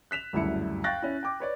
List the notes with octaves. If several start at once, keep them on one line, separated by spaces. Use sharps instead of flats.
F#6 B6 E7 F7
F#1 D2 G2 E4 C#7
F5 G5 C#6 F#6 A6 A#6
C#4 E4
G5 D6
B4 C#5 D5